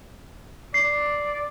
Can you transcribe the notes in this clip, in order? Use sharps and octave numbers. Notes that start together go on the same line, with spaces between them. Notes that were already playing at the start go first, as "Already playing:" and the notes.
D5 C7